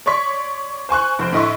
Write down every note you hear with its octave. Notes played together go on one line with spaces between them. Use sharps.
C#5 D5 C6 C#6 B6
C5 G#5 C#6 F#6
F1 C5 D7
A2 D3 D#5 E5 C6 C#6